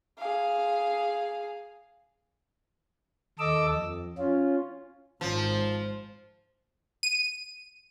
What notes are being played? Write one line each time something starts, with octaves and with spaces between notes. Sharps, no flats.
G#4 F5
D#2 A4 D#5 D6 E6
F2
C#4 F4
G#1 F3
D#7